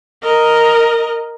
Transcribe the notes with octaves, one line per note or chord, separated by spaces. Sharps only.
A#4 D#5